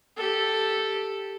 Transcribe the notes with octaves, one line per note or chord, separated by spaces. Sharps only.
G4 A4